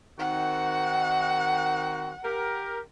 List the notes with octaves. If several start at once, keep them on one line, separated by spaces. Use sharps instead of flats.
D#3 C4 F#4 F#5
G4 A#4